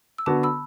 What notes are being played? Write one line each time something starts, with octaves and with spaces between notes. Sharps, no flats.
E6
D3 B3 F#4 A5 D6
B5 E6